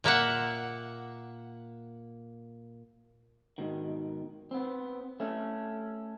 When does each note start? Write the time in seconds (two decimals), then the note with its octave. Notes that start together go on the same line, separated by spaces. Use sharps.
0.04 A#2 A#3 E5 F#5
3.58 G#2 B2 D#3
4.51 B3 C4
5.20 A3 C#4